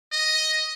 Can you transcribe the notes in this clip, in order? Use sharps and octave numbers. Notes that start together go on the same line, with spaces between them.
D#5